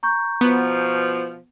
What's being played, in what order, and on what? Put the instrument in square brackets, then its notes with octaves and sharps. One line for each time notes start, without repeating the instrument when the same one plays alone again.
[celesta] A#5 C#6 G6
[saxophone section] B2 F3 [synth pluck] B3